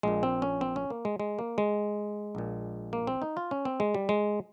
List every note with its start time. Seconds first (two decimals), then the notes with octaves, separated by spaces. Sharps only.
0.03 A#1 A#2 G#3
0.23 C4
0.42 C#4
0.61 C4
0.76 C#4
0.90 A#3
1.05 G#3
1.20 G#3
1.39 A#3
1.58 G#3
2.35 A#1 A#2
2.93 A#3
3.07 C4
3.22 D#4
3.37 F4
3.51 C#4
3.65 C4
3.80 G#3
3.94 G3
4.09 G#3